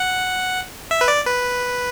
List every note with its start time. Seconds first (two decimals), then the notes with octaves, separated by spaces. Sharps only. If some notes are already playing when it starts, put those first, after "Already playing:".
Already playing: F#5
0.91 E5
1.01 B4
1.08 D5
1.25 B4